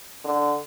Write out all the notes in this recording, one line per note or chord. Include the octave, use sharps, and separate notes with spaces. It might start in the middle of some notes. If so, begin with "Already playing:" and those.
D3